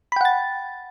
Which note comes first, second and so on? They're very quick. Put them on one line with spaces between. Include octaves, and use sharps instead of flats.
B5 G5 F#5 A6